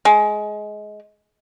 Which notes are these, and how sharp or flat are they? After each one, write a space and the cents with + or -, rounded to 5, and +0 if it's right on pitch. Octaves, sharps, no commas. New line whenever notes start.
G#3 +20